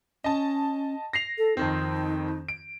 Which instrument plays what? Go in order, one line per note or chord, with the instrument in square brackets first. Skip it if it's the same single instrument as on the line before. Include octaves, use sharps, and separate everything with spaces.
[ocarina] C#4 [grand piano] D#5 A5
[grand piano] A#6 C7 F7
[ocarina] A4
[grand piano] F2 D#3 C4 [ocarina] D#4
[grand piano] D7